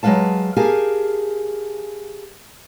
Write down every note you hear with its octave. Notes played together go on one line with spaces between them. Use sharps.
F#3 G#3 B3 B4 F5 A5
G4 G#4 A#4 F5 G#5 A5